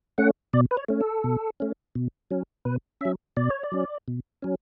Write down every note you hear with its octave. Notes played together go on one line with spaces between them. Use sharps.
A3 C#4 F#5
B2 D5
B4
C#5
A3 C#4
A4
B2
A3 C#4
B2
F#3 C#4
B2 B4
F#3 C#4 E5
B2 D5
C#5
D5
F#3 C#4
B2
F#3 C#4